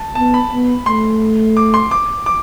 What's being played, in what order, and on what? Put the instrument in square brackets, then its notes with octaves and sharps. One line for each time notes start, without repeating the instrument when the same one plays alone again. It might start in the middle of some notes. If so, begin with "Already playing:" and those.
Already playing: [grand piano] A5
[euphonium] B3 [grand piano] A5
[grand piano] B5
[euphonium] B3
[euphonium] A3 [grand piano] C6
[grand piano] D6
C6
D6
D6